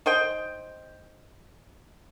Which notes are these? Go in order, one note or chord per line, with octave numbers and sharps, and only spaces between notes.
D#4 C5 G5